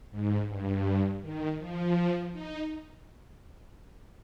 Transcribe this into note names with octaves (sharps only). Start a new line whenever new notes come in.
G#2
G2
D#3
F3
D#4